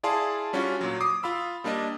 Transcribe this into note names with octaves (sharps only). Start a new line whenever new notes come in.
E4 G#4 D5 F5 A5 C6
G3 C#4 D4 F4 F#4
A#2 F#3
D6 D#6 C7
F4 F5 B5 E6
G3 A#3 D4 D5 D#5